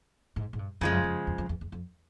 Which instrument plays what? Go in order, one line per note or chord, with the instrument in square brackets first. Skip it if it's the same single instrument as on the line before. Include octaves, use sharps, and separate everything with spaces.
[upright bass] G#2
G#2
G2
[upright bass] F2 [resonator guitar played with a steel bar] C#3 F3 G#3
[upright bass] F#2
F2
E2
F2
E2
E2
F2